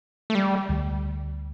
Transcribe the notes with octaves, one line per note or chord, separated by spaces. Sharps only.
A3
G3
D2 D3 G3